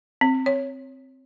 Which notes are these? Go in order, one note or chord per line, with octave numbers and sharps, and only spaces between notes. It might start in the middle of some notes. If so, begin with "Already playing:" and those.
C4
C#5